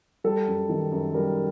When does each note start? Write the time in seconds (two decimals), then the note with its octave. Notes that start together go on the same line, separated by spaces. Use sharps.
0.24 G3 A4
0.47 F#2
0.69 D#3
0.91 F#2
1.14 G3 A#4